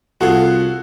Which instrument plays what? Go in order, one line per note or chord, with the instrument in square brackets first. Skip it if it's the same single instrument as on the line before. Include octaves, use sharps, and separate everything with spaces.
[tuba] C2 [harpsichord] B3 F4 G#4 [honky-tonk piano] F#4 A4